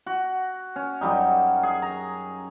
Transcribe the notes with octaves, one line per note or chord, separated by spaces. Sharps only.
F#4
C#4
F#2 F#3 G3 D#4
G#4
A#5